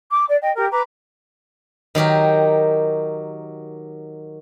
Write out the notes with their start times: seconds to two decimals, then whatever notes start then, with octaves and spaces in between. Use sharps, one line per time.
0.11 D6
0.28 D5
0.42 D#5 G5
0.55 G4 A#4
0.71 B4 A#5 B5 D6
1.95 D#3 F#3 G4 A#4